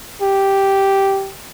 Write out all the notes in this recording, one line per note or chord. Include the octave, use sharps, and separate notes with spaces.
G4